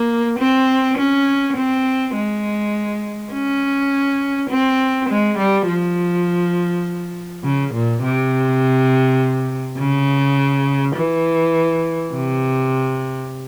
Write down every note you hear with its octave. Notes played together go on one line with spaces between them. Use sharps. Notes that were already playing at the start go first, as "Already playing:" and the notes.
Already playing: A#3
C4
C#4
C4
G#3
C#4
C4
G#3
G3
F3
C#3
A#2
C3
C#3
E3
C3